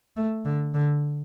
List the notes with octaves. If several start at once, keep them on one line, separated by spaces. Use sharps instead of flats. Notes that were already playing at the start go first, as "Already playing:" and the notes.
A3
D3
D3